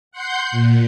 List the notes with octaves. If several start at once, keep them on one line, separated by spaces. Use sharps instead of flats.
F#5 C6 G6
A#2